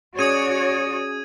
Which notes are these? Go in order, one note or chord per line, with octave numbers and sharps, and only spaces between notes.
C#4 F#4 G#4 C#5 D5 D#6 G#6 D#7